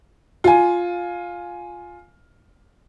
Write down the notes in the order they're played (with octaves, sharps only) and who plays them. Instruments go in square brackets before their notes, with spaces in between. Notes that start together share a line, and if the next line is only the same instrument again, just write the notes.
[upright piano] F4 G#5